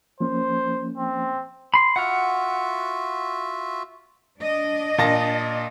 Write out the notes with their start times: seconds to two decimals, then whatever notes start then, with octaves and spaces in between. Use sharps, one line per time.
0.20 F3 A#3 C#4 C5
0.97 C4
1.74 B5 C6
1.96 F4 F#4 E5 F#5 F6
4.41 D4 D5 D#5
4.98 A#2 A5 A#6